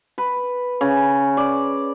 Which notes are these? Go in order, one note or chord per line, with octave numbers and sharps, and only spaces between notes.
B4
C#3
D5